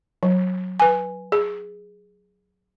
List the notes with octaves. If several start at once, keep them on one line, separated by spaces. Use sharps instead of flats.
F#3
B4 G#5
G#4